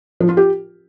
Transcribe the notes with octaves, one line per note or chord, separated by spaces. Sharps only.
F3
F4
G4